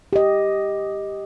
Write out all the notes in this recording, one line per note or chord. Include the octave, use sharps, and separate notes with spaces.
G4 D#5